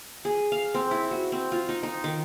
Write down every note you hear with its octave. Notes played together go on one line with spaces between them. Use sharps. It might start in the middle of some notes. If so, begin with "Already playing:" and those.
G#4
F5
C4
E4
F#4
C4
F4
D#4
D#4
D#3